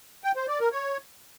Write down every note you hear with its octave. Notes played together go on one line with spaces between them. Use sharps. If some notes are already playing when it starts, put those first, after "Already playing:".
G5
C5
D5
A#4
C#5